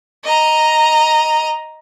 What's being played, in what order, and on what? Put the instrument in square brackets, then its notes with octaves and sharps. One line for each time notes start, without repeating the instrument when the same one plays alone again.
[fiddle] D#5 A#5